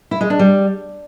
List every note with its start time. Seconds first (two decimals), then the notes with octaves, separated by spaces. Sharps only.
0.11 E4
0.21 G#3
0.30 D4
0.39 G3